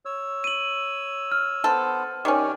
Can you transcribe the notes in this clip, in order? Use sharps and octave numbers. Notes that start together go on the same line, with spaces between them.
C#5 E6
D#7 F#7
F6
B3 A4 C5
D#3 C#4 G4 C#5 D5